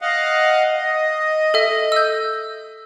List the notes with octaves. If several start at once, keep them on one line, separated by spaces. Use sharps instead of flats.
D#5 F5 F#5
D#5
A4 E5
E6 G6